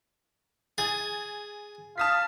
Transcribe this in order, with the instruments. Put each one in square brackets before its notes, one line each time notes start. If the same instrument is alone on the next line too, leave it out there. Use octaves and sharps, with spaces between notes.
[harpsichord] G#4 [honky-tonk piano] G#5 A6
[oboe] F5 [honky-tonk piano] A5 D#6 B6